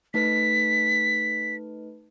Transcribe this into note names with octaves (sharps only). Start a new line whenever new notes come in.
A3 D#4 B4 B6